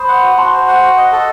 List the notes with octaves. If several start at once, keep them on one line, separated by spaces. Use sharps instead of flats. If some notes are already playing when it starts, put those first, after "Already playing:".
Already playing: C5 B5 D#6
F#5
F#4
F#4 A5 C6
C5
F#5
F#4
D#5
A4